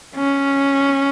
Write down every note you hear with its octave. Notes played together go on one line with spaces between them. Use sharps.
C#4